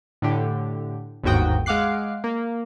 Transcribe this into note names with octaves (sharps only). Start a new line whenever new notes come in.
A2 D3 G4
G1 D#2 G#2 F#4 G5 D#6
G#3 F5 F#5 D6 F#6 C7
A#3